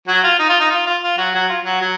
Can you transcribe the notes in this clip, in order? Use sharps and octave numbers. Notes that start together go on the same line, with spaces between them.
F#3 F#4
F4
D#4
F4
D#4
F4
F4
F4
F#3 F#4
F#3 F#4
F4
F#3 F#4
F#3